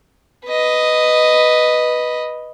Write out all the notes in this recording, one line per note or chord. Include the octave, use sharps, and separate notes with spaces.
B4 D#5